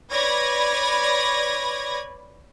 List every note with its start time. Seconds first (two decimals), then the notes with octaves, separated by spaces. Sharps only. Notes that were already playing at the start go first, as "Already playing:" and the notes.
0.11 B4 C#5 D5 B5 G#6 A#6